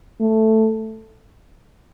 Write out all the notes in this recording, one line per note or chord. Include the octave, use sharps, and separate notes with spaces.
A3